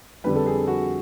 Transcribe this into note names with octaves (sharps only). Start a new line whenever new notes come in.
F2 D3 G3 B4
A4
G#4
F#4